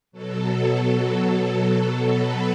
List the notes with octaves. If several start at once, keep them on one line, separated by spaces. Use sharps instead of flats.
B2 F#3 A4
B4